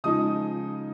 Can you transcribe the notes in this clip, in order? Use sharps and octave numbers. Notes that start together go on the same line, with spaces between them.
C#3 F3 G#3 D#4 D#6